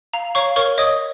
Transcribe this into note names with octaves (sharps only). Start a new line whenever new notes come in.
F5 A#5
C#5 F5 C#6
A#4 C#5 C#6
C#5 D#5 D#6